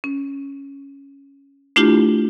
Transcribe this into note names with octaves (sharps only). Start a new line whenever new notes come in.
C#4
A3 D4 E4 F4 G4